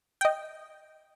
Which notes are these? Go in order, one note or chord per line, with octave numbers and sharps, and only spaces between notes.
D#5 G5